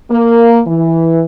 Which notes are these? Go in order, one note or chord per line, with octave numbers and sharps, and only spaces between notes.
A#3
E3